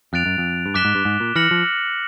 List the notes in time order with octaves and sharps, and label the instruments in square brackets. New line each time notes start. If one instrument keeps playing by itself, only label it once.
[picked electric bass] F2 [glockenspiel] F#6 A6 D7 F7
[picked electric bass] F#2
F2
G2
[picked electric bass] F#2 [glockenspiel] D6 F#6 B6 E7 G7
[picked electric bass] G#2
G2
G#2
A#2
[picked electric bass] E3 [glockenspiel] F6 A#6 C#7 F#7
[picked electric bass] F3